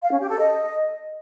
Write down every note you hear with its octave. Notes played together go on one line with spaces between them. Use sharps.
F5
C#4
G4
A4
D#5